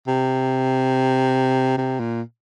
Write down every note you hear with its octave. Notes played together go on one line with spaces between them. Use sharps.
C3
C3
A#2